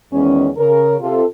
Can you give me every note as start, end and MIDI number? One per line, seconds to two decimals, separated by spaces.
0.13 0.49 40
0.13 0.49 51
0.13 0.49 56
0.13 0.49 61
0.57 0.96 49
0.57 0.96 70
1.01 1.24 48
1.01 1.24 65
1.01 1.24 69